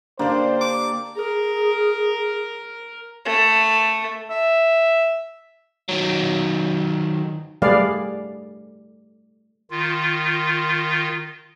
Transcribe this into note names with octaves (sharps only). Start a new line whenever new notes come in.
D3 A#3 D4 G4 C5 D5
D6
G#4 A#4
A3
E5
D#3 F#3
G3 A3 G#4 B4 D5 F5
D#3 F4